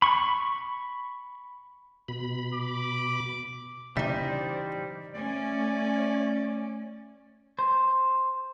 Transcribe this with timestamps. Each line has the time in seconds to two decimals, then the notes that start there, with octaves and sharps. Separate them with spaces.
0.02 B5 C#6
2.08 B2 B5
2.54 D6
3.97 C#3 E3 G3 D4 D#4 C5 D5 E5
5.14 A3 C#4 D5
7.59 C5